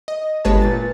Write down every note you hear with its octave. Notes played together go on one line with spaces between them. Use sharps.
D#5
G1 G#3 B4 C#5 A5
A#2 A6